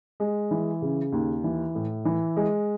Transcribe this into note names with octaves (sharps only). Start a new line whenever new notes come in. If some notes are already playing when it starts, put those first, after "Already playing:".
G#3
E3
C#3
D#2
E3
A2
E3
G#3